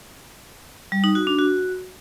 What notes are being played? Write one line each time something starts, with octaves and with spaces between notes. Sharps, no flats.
G3
D#4
F#4
D4
F#4